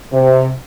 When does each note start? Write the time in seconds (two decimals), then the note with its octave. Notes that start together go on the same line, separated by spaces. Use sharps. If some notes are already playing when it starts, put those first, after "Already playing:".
0.12 C3